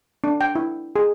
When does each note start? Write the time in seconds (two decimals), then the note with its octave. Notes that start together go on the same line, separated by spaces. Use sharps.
0.24 D4
0.41 G5
0.55 E4
0.96 G#4